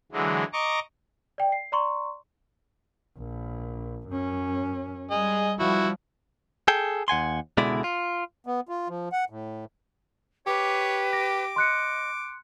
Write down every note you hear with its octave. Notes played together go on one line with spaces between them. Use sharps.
D3 E3 F#3 G#3
D#5 A#5 C#6 D6
D5 G5
C7
D5 A#5 C6 C#6
A#1
F#2 C#4
G3 G#4 D#5
F3 G3 E4 F#4
G#4 A4 G5
D#2 F#5 G#5 C6
C#2 B2 D3 G#3 E4 D5
F4
B3
F4
F3
F#5
A2
G4 B4 C#5 D6
D6 A#6
D#5 C6 F#6 C#7